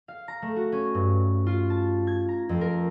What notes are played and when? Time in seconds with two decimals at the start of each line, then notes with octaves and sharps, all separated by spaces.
0.08 F5
0.28 A#5
0.42 A3
0.56 F#4
0.72 C#4
0.95 G2
1.47 F4
1.70 A5
2.07 G#6
2.29 A#5
2.49 F2
2.61 A#4